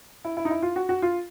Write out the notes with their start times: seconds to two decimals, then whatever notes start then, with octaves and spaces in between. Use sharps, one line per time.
0.25 E4
0.37 E4
0.45 D#4
0.50 E4
0.62 F4
0.76 F#4
0.89 F#4
1.02 F4